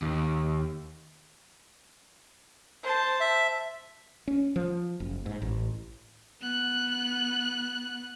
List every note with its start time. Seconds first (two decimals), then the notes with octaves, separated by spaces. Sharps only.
0.02 D#2
2.83 C5 A5
3.20 E5
4.28 C#4
4.56 F3
5.00 F#1
5.26 G#2
5.42 A1
6.41 B3 F#6